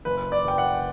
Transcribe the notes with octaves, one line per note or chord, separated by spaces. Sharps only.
F#1 B4
D5
F#1 G5
F#5